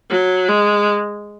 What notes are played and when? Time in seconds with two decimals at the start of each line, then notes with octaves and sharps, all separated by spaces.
0.10 F#3
0.49 G#3